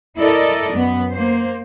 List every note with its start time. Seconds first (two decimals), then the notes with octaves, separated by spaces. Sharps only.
0.17 E4 A4 A#4 D5 D#5
0.73 F#2 B3
1.11 A#3 C5